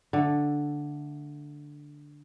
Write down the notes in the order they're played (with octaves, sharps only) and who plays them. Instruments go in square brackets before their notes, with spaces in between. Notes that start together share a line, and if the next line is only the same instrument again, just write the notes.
[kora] D3 A3